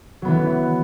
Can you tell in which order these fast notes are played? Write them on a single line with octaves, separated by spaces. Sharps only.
F#3 B3 E3